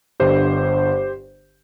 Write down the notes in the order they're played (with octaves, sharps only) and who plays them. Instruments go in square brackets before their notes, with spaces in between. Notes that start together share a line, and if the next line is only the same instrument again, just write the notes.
[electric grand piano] G1 G2 D3 G4 C5